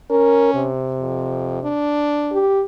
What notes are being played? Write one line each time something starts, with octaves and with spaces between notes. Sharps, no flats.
C#4 A#4
C3
F2
D4
G4